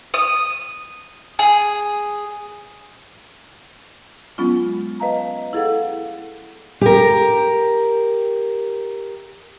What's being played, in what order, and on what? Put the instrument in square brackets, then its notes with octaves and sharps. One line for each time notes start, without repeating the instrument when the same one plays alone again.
[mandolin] D#6
G#4
[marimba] F#3 G#3 B3 C#4 F4
B4 D#5 F5 A5 A#5
E4 G#4 A4 F5 F#5
[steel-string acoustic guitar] G4 A#4